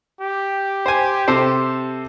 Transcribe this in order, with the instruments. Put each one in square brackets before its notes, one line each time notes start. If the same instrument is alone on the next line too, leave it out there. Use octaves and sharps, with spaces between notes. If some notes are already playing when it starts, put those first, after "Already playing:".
[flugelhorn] G4
[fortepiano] C5 G#5
C3 A4 C5